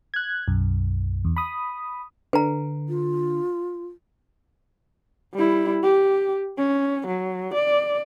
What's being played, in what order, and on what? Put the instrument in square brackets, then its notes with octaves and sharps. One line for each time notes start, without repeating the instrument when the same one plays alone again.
[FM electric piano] F#6 G#6
B1 F#2
E2
B5 D#6
[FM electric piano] D3 [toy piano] B4 A#5
[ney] F4
[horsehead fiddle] G3 E4
G4
C#4
F#3
D5